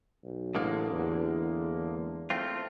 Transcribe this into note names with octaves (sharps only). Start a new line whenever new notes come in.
B1
A1 D3 G#3 A#3
E2
A3 C4 F4